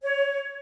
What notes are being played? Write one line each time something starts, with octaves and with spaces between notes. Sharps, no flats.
C#5